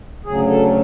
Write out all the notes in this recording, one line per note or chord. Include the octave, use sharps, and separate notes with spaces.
D2 C#3 F#3 G#4
A4